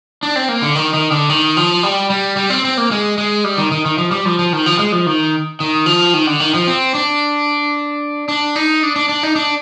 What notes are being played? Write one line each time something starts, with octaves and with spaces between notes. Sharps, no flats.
D4
C4
A#3
D3
D#3
D#3
D3
D#3
F3
G3
G3
G3
C4
C4
A#3
G#3
G#3
G3
D#3
D#3
D#3
F3
G3
F3
F3
D#3
F3
G#3
F3
D#3
D#3
F3
D#3
D3
D#3
F3
C4
D4
D4
D#4
D4
D4
D4
D#4
D4